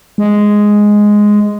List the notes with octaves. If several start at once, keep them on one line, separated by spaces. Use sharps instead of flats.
G#3